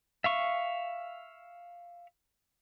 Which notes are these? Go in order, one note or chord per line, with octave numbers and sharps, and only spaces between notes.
E5 F5 C#6